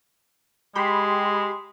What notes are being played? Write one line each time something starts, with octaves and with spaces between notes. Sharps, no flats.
G#3 G4 B5 C6